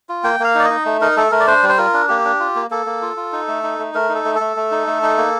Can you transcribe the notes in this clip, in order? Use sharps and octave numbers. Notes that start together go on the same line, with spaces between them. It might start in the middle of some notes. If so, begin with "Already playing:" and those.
F4
A#3 G5
A#3 F5
D#4 D5
D#5
D#4
A3
D#4 A#4
A3 A4
A3 A#4
D5
D4 C5
G3
C5
F4 A#4
D4
A#3 G4
D4
F4
A#3
A#3 A4
A#3
F4
F4
D#4
A3
D#4
A3
A3 A#4
D#4
A4
A3
A4
A3
A3
D#4
A3
D#4
A#3